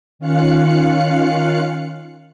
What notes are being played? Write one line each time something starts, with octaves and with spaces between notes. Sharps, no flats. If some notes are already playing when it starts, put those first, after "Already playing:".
D#3 C#4 F4 F5 F#6 C#7